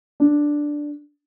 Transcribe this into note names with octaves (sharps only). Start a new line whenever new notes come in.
D4